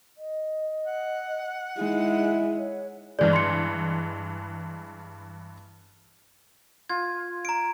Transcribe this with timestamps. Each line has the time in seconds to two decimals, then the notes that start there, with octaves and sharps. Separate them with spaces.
0.18 D#5
0.86 F#5
1.78 G#3 D#4 E4
2.58 C#5
3.19 G2 E3 G#3 D5
3.33 C6 C#7
6.90 F4 G#6
7.45 A#5 D7